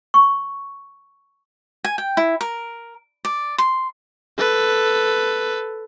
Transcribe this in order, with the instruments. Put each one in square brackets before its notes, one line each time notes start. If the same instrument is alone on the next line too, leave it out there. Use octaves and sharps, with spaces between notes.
[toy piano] C#6
[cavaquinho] G#5
G5
E4
A#4
D5
C6
[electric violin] A4 B4